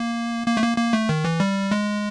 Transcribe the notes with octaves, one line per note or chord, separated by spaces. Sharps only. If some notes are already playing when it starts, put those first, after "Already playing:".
Already playing: A#3
A#3
A3
A#3
A#3
A3
D#3
E3
G3
G#3